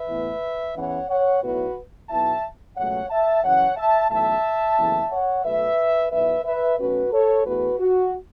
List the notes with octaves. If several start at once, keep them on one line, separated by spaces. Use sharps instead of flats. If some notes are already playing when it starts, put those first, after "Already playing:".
Already playing: B4 E5
A2 E3 B3 E4
E2 E3 C#4 C#5 F#5
C#5 F#5
B1 A2 F#3 B3 E4 F#4 B4
B1 B2 B3 E4 E5 A5
C#2 B2 F#3 A3 C#5 F#5
E5 A5
F#2 C#3 E3 C#4 C#5 F#5
E5 A5
B1 A2 E3 A3 E5 A5
F#1 E2 E3 A3 E4
C#5 F#5
B1 B2 A3 B4 E5
B1 B2 B3 E4 B4 E5
B4 E5
B1 B2 A3 C#4 F#4 B4
A4 C#5
E2 E3 A3 E4 F#4 B4
F#4